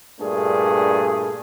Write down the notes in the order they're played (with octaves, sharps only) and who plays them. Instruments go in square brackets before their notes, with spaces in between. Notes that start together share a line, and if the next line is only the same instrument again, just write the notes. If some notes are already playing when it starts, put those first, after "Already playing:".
[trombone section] G2 A#2 A3 D4 G#4